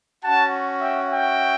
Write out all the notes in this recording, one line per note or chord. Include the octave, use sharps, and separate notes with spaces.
C#4 F#4 F#5 A5
E5 G5
E5 G5